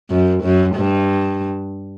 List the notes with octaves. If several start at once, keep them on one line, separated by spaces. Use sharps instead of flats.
F#2
F#2
G2